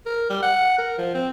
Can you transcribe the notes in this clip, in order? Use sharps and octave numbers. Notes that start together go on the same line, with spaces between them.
A#4
G3
F#5
A#4
F3
C4